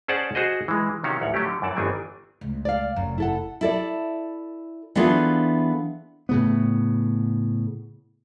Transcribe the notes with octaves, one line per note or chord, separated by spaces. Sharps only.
C#4 G#4 C5 D5 F#5 A5
F#4 G#4 C5 D#5
E3 G#3
C3 D#3 C#4 F#4 F5
A1 D2 C#5 F#5
F#3 A3 C#4 G4
D3
F#2 E3 D5 A5
G1 D#3 E3 C4 D4 G#5
C#2 A3
D5 F5
F1 F#2
E4 A4 F#5
E4 A4 D5
E3 B3 D4 F4 G#4 A4
A2 C#3 B3